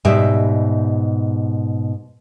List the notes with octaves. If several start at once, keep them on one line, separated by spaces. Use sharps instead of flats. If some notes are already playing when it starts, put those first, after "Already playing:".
G#2 B2 G3 G4 E5